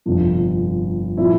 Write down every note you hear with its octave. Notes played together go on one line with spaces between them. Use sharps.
G1 F2 C3 F3
A#2 F3 C4 E4